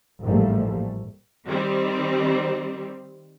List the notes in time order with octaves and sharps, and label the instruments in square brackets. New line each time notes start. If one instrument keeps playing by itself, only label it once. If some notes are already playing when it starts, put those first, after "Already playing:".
[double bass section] A1 G#2 F3 G3 A3 A#3
[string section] D#3 G3 C4